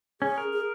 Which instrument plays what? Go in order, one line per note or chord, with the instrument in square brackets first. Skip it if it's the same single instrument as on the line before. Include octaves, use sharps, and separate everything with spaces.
[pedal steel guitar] C#4 [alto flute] G#4
[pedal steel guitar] A#4
[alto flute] G#4